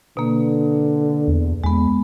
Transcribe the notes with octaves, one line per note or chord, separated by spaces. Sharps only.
B2 D3 A#3
E2
E2 G#3 B3